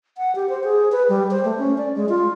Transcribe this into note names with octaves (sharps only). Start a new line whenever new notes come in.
F#5
G4
C5
G#4
B4
G3
C5
A3
C#4
D5
G#3
F4